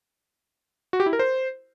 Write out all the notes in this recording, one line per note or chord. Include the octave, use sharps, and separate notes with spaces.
F#4
G4
E4
A#4
C5